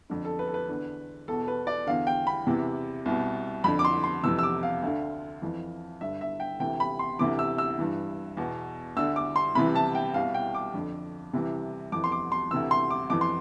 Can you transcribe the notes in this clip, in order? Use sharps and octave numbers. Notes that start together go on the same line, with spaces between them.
F2 D3
A4
B4
A4
B4
E2 D3
E2 B2 A4
B4
D5
E2 D3 F5
G5
B5
E2 C3 E3
C2 B2
F2 D3 B5
D6
C6
C6
F2 C3 E3 E6
E6
D6
F5
D2 D3
F2 E3
G2 D3 E5
E5
G5
D2 C3 E3 G5
B5
C6
D2 C3 E3 D6
E6
E6
G2 E3
E2 B2
D2 D3 E6
D6
C6
C2 C3 E3 B5
A5
G5
C2 B2 F5
G5
D6
F2 D3
C2 C3 E3
F2 E3 D6
C6
D6
C6
D2 C3 E3 E6
C6
D6
F2 E3 D6
C6